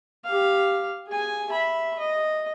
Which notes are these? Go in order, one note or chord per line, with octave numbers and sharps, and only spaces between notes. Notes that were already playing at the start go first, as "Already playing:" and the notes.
G4 F5
G#4 G#5
E5 B5
D#5